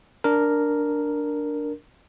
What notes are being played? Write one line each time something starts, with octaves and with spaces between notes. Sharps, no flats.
D4 A#4